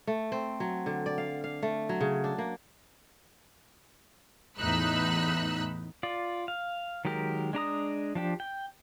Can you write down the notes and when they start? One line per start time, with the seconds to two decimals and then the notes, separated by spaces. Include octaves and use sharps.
0.07 A3
0.32 C4
0.60 F#3
0.86 D3
1.06 D5
1.18 F5
1.44 F5
1.63 A3
1.89 F#3
2.01 C#3
2.24 D4
2.38 A#3
4.58 E2 A2 D#4 B5 E6 F#6
6.03 F4 D5
6.48 F5
7.05 D#3 F#3 G#3 G4 A#4
7.53 G#3 D4 A#5 D#6
8.15 F3 D4 G4
8.40 G5